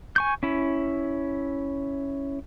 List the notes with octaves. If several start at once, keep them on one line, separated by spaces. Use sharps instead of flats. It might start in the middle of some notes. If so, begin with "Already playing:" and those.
G#5 C#6 G6
C#4 E4